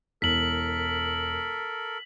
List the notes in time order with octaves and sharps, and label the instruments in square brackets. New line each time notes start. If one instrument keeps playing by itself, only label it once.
[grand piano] E1 [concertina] A4 A#4 [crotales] B6 F#7